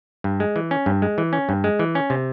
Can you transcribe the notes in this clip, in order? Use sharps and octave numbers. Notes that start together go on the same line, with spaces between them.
G2
G#3
E3
C#4
G2
G#3
E3
C#4
G2
G#3
E3
C#4
C3